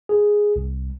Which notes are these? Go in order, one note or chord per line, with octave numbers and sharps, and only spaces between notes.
G#4
C2